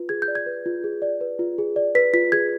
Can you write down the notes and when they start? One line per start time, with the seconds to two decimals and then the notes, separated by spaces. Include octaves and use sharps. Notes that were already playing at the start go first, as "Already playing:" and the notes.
Already playing: F4 B4
0.09 G#4 G#6
0.22 G6
0.28 D5
0.35 G#6
0.46 B4
0.66 F4
0.84 G#4
1.02 D5
1.21 B4
1.39 F4
1.58 G#4
1.76 D5
1.95 B4 B6
2.13 F4 B6
2.32 G#4 G#6